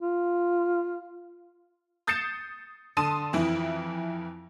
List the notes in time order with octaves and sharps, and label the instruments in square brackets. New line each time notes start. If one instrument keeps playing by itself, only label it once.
[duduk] F4
[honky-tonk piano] D#6 G6 A6 C7 C#7 E7
D3 A5 C6 D#6 D#7
F2 E3 E4